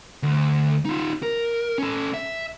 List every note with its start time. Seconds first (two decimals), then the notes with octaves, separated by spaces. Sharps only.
0.23 D2
0.85 D#4 F4
1.23 A#4
1.78 C#4 A4
2.14 E5